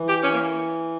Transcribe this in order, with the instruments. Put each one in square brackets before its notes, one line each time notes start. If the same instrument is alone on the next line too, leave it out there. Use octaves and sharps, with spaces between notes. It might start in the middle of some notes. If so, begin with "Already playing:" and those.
Already playing: [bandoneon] E3
[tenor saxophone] G4
C#4
A#3